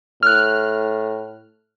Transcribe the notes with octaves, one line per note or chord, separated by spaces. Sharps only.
A2 F6 F#6